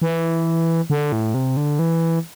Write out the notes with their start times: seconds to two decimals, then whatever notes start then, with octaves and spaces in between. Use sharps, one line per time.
0.02 E3
0.90 D3
1.12 A2
1.34 C3
1.57 D3
1.79 E3